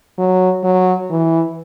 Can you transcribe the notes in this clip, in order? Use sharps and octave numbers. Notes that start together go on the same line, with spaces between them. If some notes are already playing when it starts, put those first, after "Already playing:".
F#3
F#3
E3